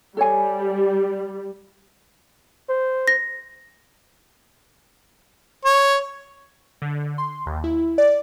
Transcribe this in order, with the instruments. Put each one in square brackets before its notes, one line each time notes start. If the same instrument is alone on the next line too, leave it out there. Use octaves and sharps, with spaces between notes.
[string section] G3 [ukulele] A4 C#5 G#5
[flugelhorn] C5
[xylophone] A#6
[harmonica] C#5
[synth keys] D3
C6
D#2
E4
D5